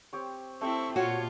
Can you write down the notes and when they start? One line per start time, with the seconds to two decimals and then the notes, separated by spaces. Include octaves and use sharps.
0.13 C4 G4 C#5
0.61 A3 C4 E4 G4 C#6
0.96 A#2 F4 F#4 C#5